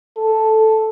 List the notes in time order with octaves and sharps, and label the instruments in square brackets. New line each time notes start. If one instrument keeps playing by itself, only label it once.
[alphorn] A4